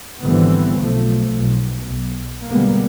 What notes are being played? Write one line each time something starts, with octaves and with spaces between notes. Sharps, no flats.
G#1 D3 E3 G3 B3 C4
B1 F3 A3
B1
B1
B2 D3 G3 G#3 A#3 B3